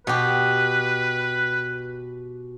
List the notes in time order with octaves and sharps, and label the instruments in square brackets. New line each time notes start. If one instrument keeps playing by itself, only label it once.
[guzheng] B2 G4 [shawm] B4